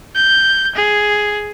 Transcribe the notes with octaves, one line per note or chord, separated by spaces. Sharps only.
G6
G#4